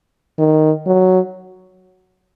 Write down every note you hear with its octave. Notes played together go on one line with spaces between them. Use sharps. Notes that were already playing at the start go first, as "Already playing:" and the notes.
D#3
F#3